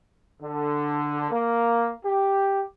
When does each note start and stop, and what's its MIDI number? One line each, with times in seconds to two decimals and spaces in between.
0.41 1.26 50
1.31 1.91 58
2.04 2.63 67